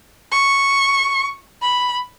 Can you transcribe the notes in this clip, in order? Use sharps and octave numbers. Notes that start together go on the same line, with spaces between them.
C#6
B5